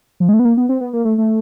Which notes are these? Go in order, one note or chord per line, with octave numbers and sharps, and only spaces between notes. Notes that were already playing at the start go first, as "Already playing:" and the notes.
F3
G#3
A3
B3
A#3
B3
C4
B3
A#3
A3
A3